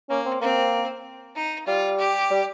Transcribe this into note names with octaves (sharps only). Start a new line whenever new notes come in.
A#3 C#4
C4
A#3 C4
D#4
G3 F4
G4
G3